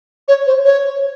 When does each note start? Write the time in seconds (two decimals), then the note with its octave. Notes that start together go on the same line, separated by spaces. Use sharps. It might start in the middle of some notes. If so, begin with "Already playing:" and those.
0.28 C#5
0.47 C5
0.65 C#5